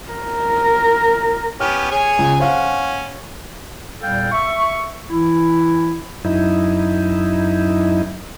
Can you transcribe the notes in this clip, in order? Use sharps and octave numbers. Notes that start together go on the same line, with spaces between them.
A#4
B3 C#4 G4 F6
G#4 C#5 G#5
C#2
C#4 C5 F5 F#5
E2 A#2 G3 A4 F5 G5
E5 C#6
E3 E4
F#2 D#4 E4